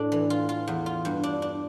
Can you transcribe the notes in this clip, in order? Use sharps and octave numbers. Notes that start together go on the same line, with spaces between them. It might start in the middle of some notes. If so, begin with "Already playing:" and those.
Already playing: A2 D4 A4
E3
F4
F4
E2
F4
G2
D4
D4